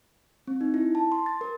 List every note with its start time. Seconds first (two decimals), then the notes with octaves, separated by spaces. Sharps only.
0.47 C4
0.61 D#4
0.74 E4
0.95 A5
1.12 C6
1.26 A6
1.41 A#4